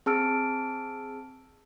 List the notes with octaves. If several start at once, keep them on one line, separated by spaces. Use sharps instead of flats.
C4 G#4 A5 E6 F6 D7